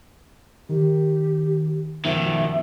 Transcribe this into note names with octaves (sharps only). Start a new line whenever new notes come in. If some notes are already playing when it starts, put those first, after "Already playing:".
D#3 G4
B2 D#3 F3 E5